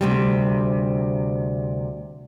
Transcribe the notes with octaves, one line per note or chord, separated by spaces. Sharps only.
D2 C3 G3